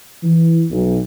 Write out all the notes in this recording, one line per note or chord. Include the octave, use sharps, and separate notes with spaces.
E3
B1